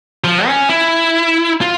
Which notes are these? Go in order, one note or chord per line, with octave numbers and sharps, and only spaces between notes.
F3
C#4
E4
F4